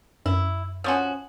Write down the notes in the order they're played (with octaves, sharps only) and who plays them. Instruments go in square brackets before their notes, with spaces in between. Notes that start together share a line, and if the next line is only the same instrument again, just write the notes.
[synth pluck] F#2 [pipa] E4
[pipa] F3 C#4 F#4 [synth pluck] G#5 C6 D#6